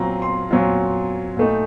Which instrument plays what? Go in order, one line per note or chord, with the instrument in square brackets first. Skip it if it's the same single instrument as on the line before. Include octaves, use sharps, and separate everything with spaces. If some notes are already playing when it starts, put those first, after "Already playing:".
Already playing: [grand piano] A#2 F#3 C4 F4 A#5
C6
A#2 F#3 C4 F4
A#2 A3 D#4